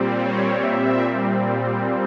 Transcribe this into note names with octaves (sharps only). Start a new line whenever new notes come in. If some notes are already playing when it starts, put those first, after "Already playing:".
Already playing: A#2 G3 C4
C#5
E5